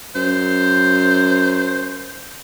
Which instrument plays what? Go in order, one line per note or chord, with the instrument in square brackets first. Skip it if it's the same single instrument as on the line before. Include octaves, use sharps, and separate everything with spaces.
[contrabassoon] F#2 [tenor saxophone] C5